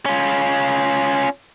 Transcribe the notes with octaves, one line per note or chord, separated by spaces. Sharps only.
C#4 F4